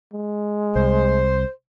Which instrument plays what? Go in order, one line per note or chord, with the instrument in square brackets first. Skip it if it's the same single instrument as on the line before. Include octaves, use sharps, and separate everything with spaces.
[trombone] G#3
[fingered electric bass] C2 [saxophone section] C5